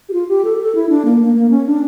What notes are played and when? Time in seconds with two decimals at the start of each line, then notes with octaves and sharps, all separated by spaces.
0.09 G4
0.13 F4
0.29 G4
0.45 A4
0.59 A4
0.75 E4
0.89 D4
1.05 A#3
1.21 A#3
1.36 A#3
1.51 C#4
1.66 D4